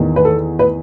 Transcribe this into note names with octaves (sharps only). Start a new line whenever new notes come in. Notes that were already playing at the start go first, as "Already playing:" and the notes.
Already playing: E2 D#3
B4
A4
B4